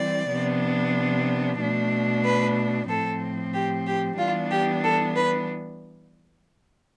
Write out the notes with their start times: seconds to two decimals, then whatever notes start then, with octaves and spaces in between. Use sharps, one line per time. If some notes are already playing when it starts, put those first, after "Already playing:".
Already playing: E3 G3 C4 D5
0.30 C3 F3 B3 D4
1.59 B2 A3 D4
2.24 B4
2.89 A2 F3 C4 A4
3.54 G4
3.87 G4
4.18 E3 G3 B3 D4 F4
4.51 G4
4.84 A4
5.16 B4